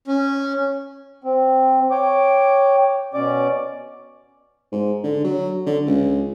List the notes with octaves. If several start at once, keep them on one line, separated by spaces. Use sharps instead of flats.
C#4
C4
C#5 G5 D6
B2 C#4 D5 D6
G#2
D3
F#3
D3
C#2